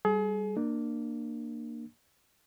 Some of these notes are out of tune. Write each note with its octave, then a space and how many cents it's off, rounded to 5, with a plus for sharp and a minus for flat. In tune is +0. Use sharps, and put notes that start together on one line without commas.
G3 +0 G#4 +35
A#3 +0 D4 +30